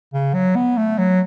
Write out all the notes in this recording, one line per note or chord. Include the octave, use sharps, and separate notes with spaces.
C#3
F#3
B3
A3
F#3